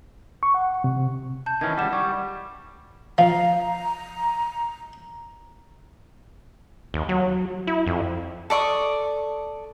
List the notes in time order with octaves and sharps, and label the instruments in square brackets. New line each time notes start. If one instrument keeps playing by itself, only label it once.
[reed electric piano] C#6
F#5
C3
[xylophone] A5 G6
[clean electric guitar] D#3 E3 C#4 [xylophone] G#6
[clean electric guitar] C#2 G3 [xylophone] F#5 E7
[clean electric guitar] G3 [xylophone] C#6
[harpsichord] F3 [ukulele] F5 [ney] A#5
[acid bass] D#2
F#3
E4
F2
[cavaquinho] A4 D5 C#6 D#6